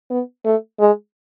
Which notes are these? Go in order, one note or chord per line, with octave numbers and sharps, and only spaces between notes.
B3
A3
G#3